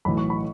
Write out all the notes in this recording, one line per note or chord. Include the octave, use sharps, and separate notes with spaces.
B1 A2 E3 B5
C#6
B5